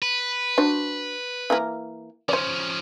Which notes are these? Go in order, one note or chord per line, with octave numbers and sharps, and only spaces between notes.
B4
D4 F#4 C5
E3 A#3 A#4
F3 C#4 C5 D5